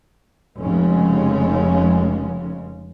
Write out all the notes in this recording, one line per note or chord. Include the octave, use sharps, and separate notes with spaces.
F1 C#3 G#3 C#4